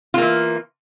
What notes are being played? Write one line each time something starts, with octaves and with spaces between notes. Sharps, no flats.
E3 A#3 F4